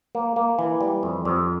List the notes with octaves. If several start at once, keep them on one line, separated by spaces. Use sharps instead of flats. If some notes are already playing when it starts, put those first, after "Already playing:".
A#3
A#3
E3
G3
F2
F2